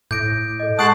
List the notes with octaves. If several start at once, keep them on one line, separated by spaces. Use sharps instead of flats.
A2 D6 D#6 G6 A#6 D7
A4 D#5
G#3 F#5 A5 C#6 D#6 F#6 C7 D7